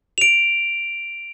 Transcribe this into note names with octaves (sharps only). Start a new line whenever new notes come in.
D7 F7